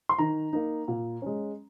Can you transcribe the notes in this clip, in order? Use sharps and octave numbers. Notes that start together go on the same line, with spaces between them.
C6
D#3 A#5
A#3 D#4
A#2
G#3 C#4